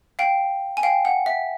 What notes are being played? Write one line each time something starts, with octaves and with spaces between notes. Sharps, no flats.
F5 G5
G#5
F5 G5
F#5
E5